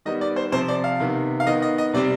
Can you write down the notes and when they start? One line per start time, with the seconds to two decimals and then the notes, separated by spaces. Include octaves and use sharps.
0.05 D#3 G3 B3 D#5
0.21 D5
0.36 C5
0.52 C3 F3 C4 C5
0.68 D5
0.84 F5
1.00 C3 D#3 B3
1.40 F5
1.47 D#3 B3 D#5
1.62 D#5
1.78 D#5
1.93 C3 G3 C4 D5